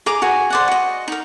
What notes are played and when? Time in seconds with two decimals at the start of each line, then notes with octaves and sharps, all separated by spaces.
0.06 G#4 A#5 D6
0.22 F#4 G#4 G#5
0.50 C5 D5 F#5
0.68 F#4 D#5
1.08 D#4 A#4